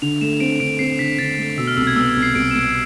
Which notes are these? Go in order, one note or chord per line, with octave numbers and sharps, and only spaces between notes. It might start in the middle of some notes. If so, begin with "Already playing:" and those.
D3 F7
A3 E7
C4 D7
D3 D7
C4 C7
D3 B6
D3 A6
A3
B2 E6
F6
C2 E6
G#6
B3 E6
E6
C2
C7
C2 D7
E7
B3 D7